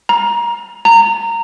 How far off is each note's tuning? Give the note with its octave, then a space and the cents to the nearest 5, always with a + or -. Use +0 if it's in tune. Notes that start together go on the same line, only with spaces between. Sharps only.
A#5 +20
A#5 -20